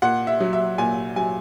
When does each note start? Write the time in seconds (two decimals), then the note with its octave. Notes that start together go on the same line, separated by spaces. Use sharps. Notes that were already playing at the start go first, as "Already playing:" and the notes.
0.02 A#2 F#5
0.27 E5
0.40 F#3
0.53 E5
0.78 A#2 G#5
1.16 F#3 G#5